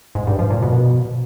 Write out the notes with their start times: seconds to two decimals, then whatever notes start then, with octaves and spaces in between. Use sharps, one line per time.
0.15 G#2
0.27 G2
0.39 F3
0.51 A#2
0.62 B2